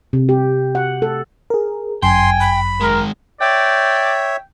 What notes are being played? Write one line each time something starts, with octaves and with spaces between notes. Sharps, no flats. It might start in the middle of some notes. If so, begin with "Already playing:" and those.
C3
G4
F#5
A4
G#4 A#4
G1 F#2 G5 G#5 C6
B5
D#3 G#3 A#4
C#5 D5 E5 G5